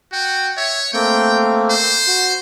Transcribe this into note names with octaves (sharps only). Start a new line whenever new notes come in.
F#4 G5
C#5 E5
A3 A#3 C4 G5
C5
F#4